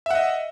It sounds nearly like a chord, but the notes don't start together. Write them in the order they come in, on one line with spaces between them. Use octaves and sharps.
E5 F#5 D#5